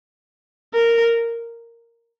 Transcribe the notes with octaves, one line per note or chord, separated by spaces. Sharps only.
A#4